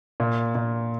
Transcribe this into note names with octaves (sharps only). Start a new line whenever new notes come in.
A#2
A#2